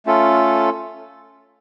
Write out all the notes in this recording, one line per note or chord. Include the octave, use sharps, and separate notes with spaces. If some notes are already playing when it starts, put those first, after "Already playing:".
A3 C#4 F4 A4